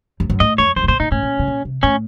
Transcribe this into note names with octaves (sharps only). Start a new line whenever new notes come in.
F2
F#2
A2 D#5
F2 C#5
F#2 C5
C3
A#2 C5
A#2 D#4
A2 C#4
A#2
C3
A#2
C3
A2 C#4